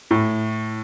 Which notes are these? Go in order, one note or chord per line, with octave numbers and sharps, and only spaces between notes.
A2